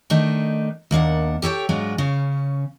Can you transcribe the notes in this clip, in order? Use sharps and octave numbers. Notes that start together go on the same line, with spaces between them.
D#3 A3 D4 D#4
D#2 A#3 D4 F#5
G4 A4 C#5 G5
G#2 F#3 G#3 D4 F4
C#3 C#4